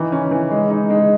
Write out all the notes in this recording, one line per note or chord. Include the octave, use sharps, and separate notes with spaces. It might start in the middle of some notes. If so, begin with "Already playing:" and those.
Already playing: D#3 E3
C#4
E3
G#3
D#4
G#3